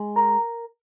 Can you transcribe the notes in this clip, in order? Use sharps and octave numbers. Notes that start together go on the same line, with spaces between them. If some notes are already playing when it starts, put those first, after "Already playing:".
Already playing: G#3
A#4